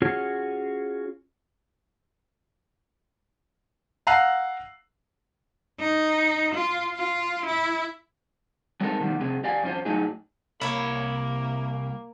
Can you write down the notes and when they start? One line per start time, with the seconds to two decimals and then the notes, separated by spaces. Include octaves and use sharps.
0.02 C#4 F4 F#4 G#4 C#5
4.07 F5 F#5 A#5 E6 F#6 C7
5.80 D#4
6.55 F4
6.94 F4
7.46 E4
8.81 G3 G#3 C4 D#4 A4 A#4
9.00 B2 D#3 F3 G3
9.20 F2 C3 C4 G#4
9.44 G4 D5 F5 G#5
9.63 F2 C#4 F4 C5
9.85 A2 F#3 A3 D#4 G#4
10.61 C2 A#3 E4 C#5 B5